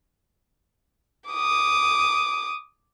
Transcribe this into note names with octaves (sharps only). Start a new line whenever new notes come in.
D6 D#6